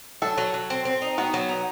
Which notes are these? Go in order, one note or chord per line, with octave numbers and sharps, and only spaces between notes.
F#3 A4
F#3
F#3
C4
C4
D#4
B3 F#4
F#3
D#4